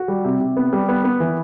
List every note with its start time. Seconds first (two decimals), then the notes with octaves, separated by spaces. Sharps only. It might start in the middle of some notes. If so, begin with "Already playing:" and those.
Already playing: F#4
0.08 G3
0.25 C3
0.40 C3
0.57 B3
0.73 G3
0.89 B3
1.04 B3
1.20 E3